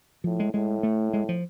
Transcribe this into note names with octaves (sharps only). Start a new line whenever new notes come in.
A2 F3
G#3
A2 G#3
A3
G#3
F3